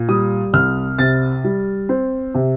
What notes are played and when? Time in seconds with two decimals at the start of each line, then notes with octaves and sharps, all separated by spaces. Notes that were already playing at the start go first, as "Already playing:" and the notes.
Already playing: A#2
0.09 G3 D#6
0.53 C2 F6
0.99 C3 A6
1.44 G3
1.89 C4
2.34 C3